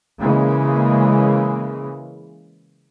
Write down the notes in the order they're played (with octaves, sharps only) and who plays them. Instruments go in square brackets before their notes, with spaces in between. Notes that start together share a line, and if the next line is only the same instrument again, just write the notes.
[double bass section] C#3 E3 G#3 A#3